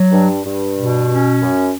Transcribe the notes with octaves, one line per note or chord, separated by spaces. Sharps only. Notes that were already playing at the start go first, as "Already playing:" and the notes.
Already playing: F#3
G2
G2
B2
C#4
F#2